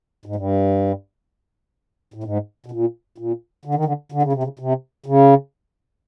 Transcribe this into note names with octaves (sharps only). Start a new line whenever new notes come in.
G#2
G2
A2
G#2
B2
A#2
A#2
D3
D#3
D3
D3
C#3
C3
C#3
C3
C#3